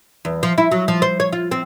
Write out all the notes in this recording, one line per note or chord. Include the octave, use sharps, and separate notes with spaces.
E2
F3
E4
F#3
F3
C5
C#5
F4
C4